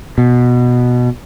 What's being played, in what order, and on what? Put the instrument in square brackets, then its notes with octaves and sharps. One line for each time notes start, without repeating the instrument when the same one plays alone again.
[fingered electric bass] B2